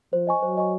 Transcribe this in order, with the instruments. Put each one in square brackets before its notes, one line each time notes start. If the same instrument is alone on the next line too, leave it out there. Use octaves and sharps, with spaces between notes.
[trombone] F3 [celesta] C5
[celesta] D#5 G#5 C#6
[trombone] F#3 [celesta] C5
[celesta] D#5 G#5 C#6